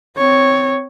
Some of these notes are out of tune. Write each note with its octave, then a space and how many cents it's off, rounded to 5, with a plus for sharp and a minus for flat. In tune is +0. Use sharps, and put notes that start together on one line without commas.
C4 -10 C#5 +0